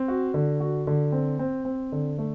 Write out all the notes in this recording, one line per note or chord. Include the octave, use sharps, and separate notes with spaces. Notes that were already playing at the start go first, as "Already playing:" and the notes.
Already playing: C4
F#4
D3
F#4
D3
C4
C4
C4
D3
A3